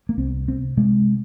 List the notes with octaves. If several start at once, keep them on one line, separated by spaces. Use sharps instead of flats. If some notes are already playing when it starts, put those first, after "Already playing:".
A#3
C2 C4
C3 C4
C3 G#3